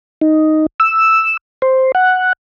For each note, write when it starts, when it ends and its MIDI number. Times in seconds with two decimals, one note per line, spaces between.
0.21 0.66 63
0.80 1.37 88
1.62 1.92 72
1.95 2.33 78